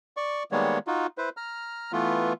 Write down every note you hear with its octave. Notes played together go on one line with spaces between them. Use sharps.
D5 C#6
D#3 G3 G#3 A#3 B3 C#5
D#4 F4 F#4
E4 B4 C5
A#5 F6
E3 A3 B3 F4